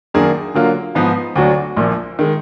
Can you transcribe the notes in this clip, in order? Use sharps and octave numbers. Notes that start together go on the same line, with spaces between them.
F#2 D#3 A#3 D4 G#4
D3 F#3 A#3 F4
G#2 F3 B3 D#4
D2 D3 F#3 D4 F#4
A#1 A#2 F3
D#3 G#3